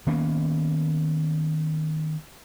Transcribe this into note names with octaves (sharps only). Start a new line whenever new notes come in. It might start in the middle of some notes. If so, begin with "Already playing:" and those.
D#3 A#3 B3 C#4